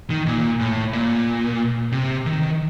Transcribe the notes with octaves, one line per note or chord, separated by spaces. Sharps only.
D#3
A#2
A2
A#2
C3
D#3